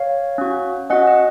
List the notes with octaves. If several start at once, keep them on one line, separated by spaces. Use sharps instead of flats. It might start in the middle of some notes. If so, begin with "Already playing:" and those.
Already playing: C#5 F5
C#4 F#4
C#4 F#4 D#5 F#5
D#5